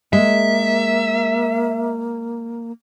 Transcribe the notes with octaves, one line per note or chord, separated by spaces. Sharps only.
G#3 A#3 E5